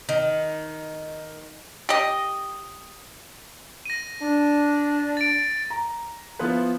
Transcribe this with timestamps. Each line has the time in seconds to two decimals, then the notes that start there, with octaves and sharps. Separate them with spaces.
0.09 D#3
1.89 G4 D#5
3.86 A#6 D#7
4.21 D4
5.17 A6 D7
5.70 A#5
6.39 F3 B3 E4 F4 B4